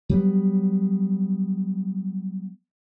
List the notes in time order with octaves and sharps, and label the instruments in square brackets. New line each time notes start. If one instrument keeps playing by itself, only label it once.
[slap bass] F#3 G3 B3